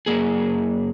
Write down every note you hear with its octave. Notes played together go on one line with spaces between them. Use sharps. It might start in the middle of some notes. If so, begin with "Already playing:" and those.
F#2 A#3 G#4